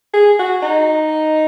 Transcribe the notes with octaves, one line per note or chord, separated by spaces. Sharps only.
G#4
F#4
D#4